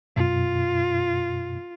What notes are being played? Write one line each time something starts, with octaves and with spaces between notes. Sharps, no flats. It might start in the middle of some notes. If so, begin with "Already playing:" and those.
F#2 B2 F4